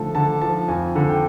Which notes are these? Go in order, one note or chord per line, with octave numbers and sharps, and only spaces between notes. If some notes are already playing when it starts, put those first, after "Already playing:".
Already playing: D3 F3 A3 A5
D3 A5
F3 A5
F2 G#5
D3
G5